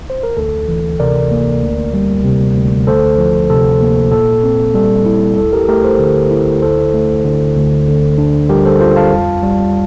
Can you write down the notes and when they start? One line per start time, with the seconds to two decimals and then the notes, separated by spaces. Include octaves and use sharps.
0.10 C5
0.23 A#4
0.37 D2 A4
0.69 E3
1.00 C3 A#4 D5
1.31 A#3
1.63 D2
1.94 G3
2.24 C3
2.56 D2
2.87 D2 A4 C5
3.18 F3
3.50 C3 A4
3.81 A#3
4.12 A#2 A4
4.44 C4
4.74 G3 A4
5.06 E4
5.37 D2 A4
5.53 G4 A#4
5.68 A3 G4 A#4
5.84 A4 C5
5.99 D3
6.31 E4
6.62 D2 A4 C5
6.94 A3
7.24 D3
7.56 D2
7.88 D3
8.18 D4
8.49 G3 G4 A#4
8.65 A4 C5
8.80 F4 A4 C5
8.97 F5 A5
9.12 F2
9.43 G3